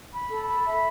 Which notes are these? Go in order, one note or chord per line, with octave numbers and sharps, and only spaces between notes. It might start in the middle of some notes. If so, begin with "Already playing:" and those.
B5
A4
B5
E5